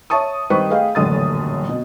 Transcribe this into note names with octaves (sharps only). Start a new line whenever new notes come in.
C#5 E5 A5 C#6 D#6
G2 D#3 G4 B4 C5 C#6
A3 G#4 B4 D#5 F5 G5
D#1 A1 F#2 D3 D#6 A6
B2